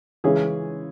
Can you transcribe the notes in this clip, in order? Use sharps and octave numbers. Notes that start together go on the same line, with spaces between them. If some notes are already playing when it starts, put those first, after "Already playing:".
C#3 E3 G#3 C#4 G#4